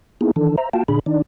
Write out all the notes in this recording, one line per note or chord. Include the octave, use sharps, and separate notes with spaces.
A#3 B3 D#4 E4 G#4
D#3 E3 D4 A4
C5 E5 A#5
A#3 F4 F#4 F5 G5 A5
A#2 D3 D4 G#4 B5
D#3 D4 D#4 D5